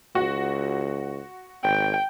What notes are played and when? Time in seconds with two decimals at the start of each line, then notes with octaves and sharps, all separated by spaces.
0.15 C#2 F#4
1.63 G#1 G5